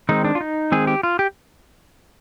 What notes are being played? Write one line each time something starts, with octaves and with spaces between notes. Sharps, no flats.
D#3 G#3 C4 D#4
D4
F4
D#4
D#3 G#3 C4 G#4
G4
F4
G4